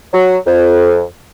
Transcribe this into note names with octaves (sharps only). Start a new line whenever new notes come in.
F#3
F2